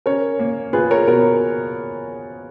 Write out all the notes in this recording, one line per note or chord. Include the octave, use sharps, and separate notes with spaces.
C#4 A#4 C#5
A#3
F4 G#4 B4
A#4 C#5
B2 A#4